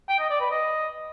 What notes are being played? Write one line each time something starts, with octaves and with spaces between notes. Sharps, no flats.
G5
D#5
D5
B4
D#5